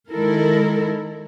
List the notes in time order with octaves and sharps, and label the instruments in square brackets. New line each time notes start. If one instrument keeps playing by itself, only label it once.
[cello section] D#3 G#3 E4 A4 A#4